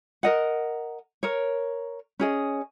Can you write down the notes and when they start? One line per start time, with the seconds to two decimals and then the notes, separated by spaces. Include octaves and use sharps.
0.23 A#4 D#5 F#5
1.23 A#4 C#5
2.20 C#4 G#4 D#5